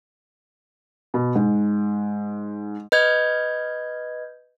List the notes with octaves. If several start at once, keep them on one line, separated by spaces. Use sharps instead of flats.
B2
G#2
B4 D#5 G6 G#6